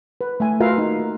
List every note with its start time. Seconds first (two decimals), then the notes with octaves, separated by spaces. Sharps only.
0.21 B4
0.40 A3 E5 G#5
0.60 F4 F#4 A#4 B4 E5 F5
0.77 A#3 D#4
0.99 A#4